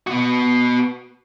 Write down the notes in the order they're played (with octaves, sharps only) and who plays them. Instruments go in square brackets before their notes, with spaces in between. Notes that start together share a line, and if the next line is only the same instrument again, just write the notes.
[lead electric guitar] B3 F#4